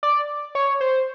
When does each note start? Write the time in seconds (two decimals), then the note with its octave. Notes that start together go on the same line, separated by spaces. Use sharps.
0.03 D5
0.55 C#5
0.81 C5